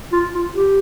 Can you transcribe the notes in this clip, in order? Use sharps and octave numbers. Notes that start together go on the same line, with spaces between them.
F4
F4
G4